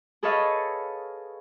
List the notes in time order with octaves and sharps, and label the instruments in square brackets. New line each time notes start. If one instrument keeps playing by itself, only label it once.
[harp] G#4 A4 B4 C#5 D#5 F5